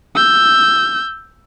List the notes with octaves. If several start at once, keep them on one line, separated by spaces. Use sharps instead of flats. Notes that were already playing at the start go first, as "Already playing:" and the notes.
E6 G6